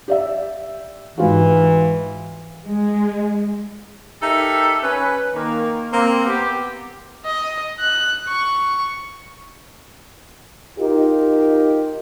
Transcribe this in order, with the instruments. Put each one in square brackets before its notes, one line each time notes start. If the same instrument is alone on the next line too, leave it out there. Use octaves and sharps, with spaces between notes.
[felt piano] G4 D5 E5
[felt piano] G#2 F4 F#4 [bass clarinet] E3
[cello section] G#3
[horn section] D#4 G4 A4 A#4 E5
C#4 B4
D#3 A#3
A#3 C4
B3 G4
[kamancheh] D#5
F#6
C#6
[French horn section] D#4 F4 G4 A#4